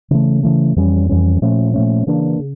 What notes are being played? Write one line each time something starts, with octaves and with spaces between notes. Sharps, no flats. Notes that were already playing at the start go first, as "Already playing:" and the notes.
C#3 E3 A3
C#3 E3 A3
F2 E3 G3 C#4
F2 E3 G3 C#4
A#2 F3 A3 C#4
A#2 F3 A3 C#4
C#3 E3 A#3 D4
C#3